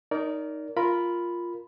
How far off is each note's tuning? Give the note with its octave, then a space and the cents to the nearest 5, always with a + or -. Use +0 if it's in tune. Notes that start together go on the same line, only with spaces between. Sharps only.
D#4 +0 A#4 +0 D5 -35
F4 +0 A#4 +0 B5 +0